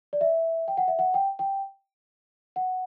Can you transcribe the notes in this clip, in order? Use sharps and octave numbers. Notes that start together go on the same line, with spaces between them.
D5
E5
G5
F#5
E5
F#5
G5
G5
F#5